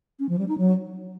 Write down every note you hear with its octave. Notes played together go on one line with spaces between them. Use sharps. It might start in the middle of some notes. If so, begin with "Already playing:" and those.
C#4
F3
G3
D#4
F#3